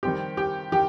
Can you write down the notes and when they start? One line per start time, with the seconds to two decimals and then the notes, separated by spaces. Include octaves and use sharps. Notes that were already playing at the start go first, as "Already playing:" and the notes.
0.03 D#3 G3 C4 G4 G5
0.37 G4 G5
0.72 D#3 G4 G5